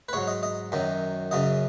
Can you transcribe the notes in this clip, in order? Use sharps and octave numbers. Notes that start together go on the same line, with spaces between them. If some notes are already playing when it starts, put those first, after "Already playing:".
B4
G#2 F#3 C#5
D#5
D#5
F#2 D#3 F#3
F#2 C#3 F#3 D#5